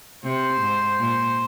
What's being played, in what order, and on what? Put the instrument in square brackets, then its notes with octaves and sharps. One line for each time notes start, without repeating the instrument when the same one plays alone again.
[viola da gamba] C3 [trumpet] C5
[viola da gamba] G#2
A#2